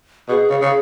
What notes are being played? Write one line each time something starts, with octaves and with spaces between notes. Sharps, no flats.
B2 G#4
C#3
C#3